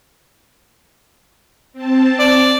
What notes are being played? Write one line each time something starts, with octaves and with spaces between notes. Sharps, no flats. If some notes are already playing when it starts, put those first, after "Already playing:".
C4 A5
D5